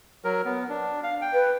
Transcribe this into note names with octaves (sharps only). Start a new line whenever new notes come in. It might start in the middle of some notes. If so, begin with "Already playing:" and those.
F#3 A#4
B3
D4
F5
G5
B4